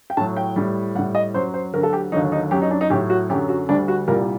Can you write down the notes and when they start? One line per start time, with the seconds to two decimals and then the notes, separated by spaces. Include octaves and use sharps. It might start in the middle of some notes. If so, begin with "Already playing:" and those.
0.10 G5
0.17 A2 F#3 A5
0.37 G5
0.56 A2 G3
0.95 G3 F#5
0.99 A2
1.15 D#5
1.34 F#2 F#3 C5
1.54 C5
1.73 D2 D3 F#3 A#4
1.83 A4
1.93 G4
2.12 D#2 D3 F#3 D#4
2.32 D#4
2.51 F#2 F#3 G4
2.62 D#4
2.71 D4
2.81 D#4
2.90 A2 G4
2.94 F#3
3.10 F#4
3.29 F#2 D3 F#3 G4
3.49 F#4
3.69 D2 D3 G3 D4
3.88 F#4
4.08 C2 A#2 G3 A#4